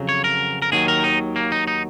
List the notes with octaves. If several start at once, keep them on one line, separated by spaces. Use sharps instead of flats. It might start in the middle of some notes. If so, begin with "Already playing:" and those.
Already playing: F2 C#3 F#3
C#5
A#4
A#4
D#2 D#3 F#3 G#4
A#4
D#4
A#3
D#4
D#4